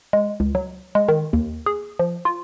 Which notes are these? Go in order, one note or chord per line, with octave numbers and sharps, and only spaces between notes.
G#3
C#2
F#3
G#3
D#3
D#2
G#4
F3
F4